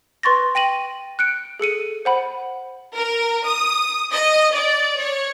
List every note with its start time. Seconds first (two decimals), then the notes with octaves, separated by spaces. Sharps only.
0.23 B4 C6 C#6 A6 A#6
0.55 G5 A#6 D#7 F#7
1.19 F#6 C#7 D7
1.59 G#4 A4 C#7 D#7
2.05 C5 F#5 B5
2.97 A#4
3.47 D#6
4.12 D#5
4.56 D5
5.00 C#5